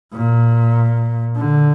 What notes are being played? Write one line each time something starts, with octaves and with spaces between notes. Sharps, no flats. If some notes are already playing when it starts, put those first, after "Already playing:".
A#2
D3